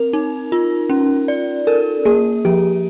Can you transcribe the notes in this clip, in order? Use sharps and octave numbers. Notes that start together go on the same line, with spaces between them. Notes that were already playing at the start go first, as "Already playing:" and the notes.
Already playing: C4 A#4
D#4
F4
C#4
D5
A4 A#4
A#3 G#4
F3 G4